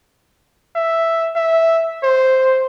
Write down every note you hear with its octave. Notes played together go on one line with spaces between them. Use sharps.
E5
E5
C5